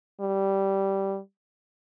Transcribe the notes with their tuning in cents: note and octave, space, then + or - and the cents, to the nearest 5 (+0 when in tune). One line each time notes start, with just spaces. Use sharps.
G3 -10